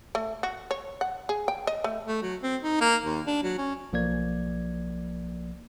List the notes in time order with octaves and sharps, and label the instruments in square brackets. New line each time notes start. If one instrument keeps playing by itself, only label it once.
[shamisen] A3
F#4
C#5
F#5
G#4
G5
D#5
A3
[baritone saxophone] A3
F#3
C4
D#4
A#3
D#2
D4
F#3
C#4
[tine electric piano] B1 F3 A#3 D5 G#6